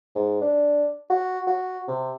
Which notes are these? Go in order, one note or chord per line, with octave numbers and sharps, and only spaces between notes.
G#2
D4
F#4
F#4
C3